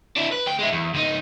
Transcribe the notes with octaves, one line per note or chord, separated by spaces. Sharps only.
D4 E4
B4
D2 G5
G#3 E4
E2
C#2 D#4